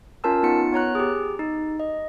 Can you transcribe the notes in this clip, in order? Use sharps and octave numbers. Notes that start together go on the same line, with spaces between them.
C#4 F4 A#4 A5 E6
B3 D#4 F4 C#7
B3 C#5 A#5 F#6
G4 G#4
D#4
D#5